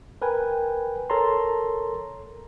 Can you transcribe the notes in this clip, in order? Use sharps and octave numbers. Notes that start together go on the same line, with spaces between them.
A#4 B4 G5 G#5
A4 A#4 C#5 A5 A#5 C6